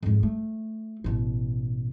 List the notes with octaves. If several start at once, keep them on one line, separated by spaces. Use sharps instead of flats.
F2 G#2
A3
A1 B2